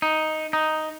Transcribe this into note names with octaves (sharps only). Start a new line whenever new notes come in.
D#4
D#4